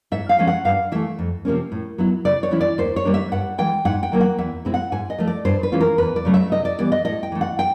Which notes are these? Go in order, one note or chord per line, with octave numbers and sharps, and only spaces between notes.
G#2 E5
F5
F3 G#3 C#4
F#5
G2 F5
E3 A3 E5
F2
C3 F3 A#3 C#4
A2
F#3 B3 E4
C#3 D5
C#5
E3 G#3 C#4 E4
D5
D#2 C5
C#5
D#3 G3 A#3 D4
E5
G2 F#5
E3 G#3 G5
G#2 F#5
G5
D#3 F#3 A#3
F#5
E2 E5
B2 G#3 C4 E4
F#5
G#2 G#5
D#5
F3 A3
D5
G2 C5
B4
E3 G#3 C#4 F4
A#4
E2 B4
D5
C#3 F#3 A3 C#4
E5
C3 D#5
D5
E3 G3 B3 D5
D#5
A2 D#5
G5
E3 A3
F#5
G5